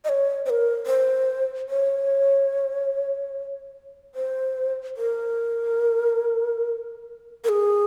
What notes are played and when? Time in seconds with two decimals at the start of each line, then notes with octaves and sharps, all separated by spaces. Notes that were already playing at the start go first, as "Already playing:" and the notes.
0.05 D#5
0.09 C#5
0.46 C5
0.50 A#4
0.87 C5
1.69 C#5
4.15 C5
4.97 A#4
7.44 A#4
7.49 G#4